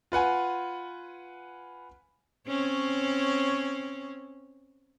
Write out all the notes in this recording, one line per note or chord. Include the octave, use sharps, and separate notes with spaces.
F4 B4 F#5 G#5
C4 C#4 C#5